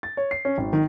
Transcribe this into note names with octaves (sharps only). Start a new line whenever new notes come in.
A6
C#5
C7
C#4
G#1
D#3